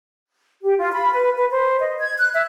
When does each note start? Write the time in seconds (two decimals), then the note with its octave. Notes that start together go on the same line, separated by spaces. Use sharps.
0.63 G4
0.79 F4
0.93 B5
1.11 B4
1.36 B4
1.50 C5
1.79 D#5
2.00 G#6
2.18 F#6
2.33 E5